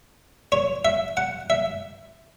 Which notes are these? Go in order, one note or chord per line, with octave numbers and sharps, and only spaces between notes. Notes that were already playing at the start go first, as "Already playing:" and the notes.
C#5
E5
F#5
E5